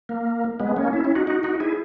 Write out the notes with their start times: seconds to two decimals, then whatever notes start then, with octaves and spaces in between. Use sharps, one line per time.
0.09 A#3
0.60 G#3 B3
0.76 A#3 C#4
0.93 C#4 E4
1.04 C#4 E4
1.15 D#4 F#4
1.27 D#4 F#4
1.43 D#4 F#4
1.60 E4 G#4